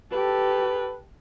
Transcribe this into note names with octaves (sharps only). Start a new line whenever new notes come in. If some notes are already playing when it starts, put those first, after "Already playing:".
G4 A4 B4